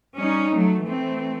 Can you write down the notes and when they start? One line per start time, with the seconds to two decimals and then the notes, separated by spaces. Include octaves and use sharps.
0.18 G3 C#4 D#4
0.52 F#3 A3
0.83 E3 A3 C4